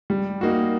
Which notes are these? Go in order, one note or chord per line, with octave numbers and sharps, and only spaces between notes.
G3
A#3 D#4 F#4